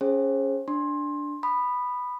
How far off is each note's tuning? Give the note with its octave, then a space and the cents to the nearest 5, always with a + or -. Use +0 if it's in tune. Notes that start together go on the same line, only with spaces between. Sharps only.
C#4 +0 G#4 +0 C5 +40
D4 +0 C6 +20
B5 +0 D#6 -30